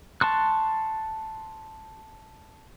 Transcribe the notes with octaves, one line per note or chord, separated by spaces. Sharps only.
A5 C6 C#6 F#6